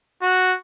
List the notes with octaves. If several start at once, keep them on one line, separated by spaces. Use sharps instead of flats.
F#4